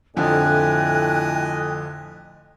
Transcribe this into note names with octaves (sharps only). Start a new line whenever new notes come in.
F2 A2 D3 F3 D#5 G5 G#5 F#6